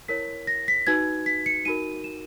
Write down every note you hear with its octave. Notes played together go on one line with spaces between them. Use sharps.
E4 A#4 C#5 B6
A#6
B6
D#4 F#4 B4 G#6
B6
C#7
D#4 F#4 A#4 D#7
E7